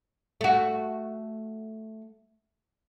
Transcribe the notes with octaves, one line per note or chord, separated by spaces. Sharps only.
A3 F#4